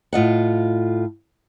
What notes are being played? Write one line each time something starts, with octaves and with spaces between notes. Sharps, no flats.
A2 F4 D#5 F#5